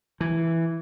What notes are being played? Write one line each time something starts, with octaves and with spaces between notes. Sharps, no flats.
E3